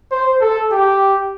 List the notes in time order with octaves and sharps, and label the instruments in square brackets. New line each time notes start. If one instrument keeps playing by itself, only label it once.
[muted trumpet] C5
A4
G4